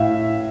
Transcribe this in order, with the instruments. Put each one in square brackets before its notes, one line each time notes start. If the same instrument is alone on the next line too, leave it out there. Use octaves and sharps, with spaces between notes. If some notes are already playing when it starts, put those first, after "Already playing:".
Already playing: [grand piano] A2 E5 F5